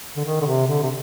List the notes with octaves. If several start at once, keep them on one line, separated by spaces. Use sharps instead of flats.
D3
D#3
D3
C3
D3
C3